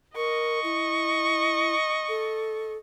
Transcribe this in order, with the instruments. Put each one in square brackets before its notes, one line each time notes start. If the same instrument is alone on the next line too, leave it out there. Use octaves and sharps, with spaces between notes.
[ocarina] A#4 [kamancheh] D#5 C#6
[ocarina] E4
A4